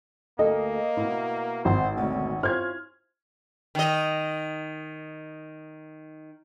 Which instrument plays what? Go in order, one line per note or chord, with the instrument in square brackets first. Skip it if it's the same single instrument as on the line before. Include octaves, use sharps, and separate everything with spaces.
[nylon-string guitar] D2 A4 [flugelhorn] A#3 [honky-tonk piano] D#5
[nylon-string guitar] B2 B3 E4
[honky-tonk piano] G#1 [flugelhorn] C5
[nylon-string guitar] D2 B2 D5 [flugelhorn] C#4
[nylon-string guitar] E4 F4 C5 [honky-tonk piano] F6 G#6
[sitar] D#3 D#5